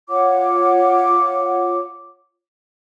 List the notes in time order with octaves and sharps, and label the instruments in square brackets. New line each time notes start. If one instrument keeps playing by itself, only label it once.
[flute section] F4 C#5 F#5 D6